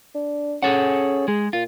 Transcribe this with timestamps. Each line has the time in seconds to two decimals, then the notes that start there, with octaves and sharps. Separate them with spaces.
0.15 D4
0.63 C#4 G#4 A4 F#5
1.28 G#3 G#4
1.53 A#2 F4